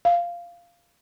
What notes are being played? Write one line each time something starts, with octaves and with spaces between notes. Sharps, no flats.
F5